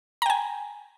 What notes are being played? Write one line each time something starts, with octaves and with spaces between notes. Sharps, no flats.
G5 G#5 A#5